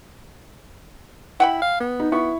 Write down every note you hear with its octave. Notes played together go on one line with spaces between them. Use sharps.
E4 F#5 G5 B5
F5
B3
D#4
B3 E4 C#6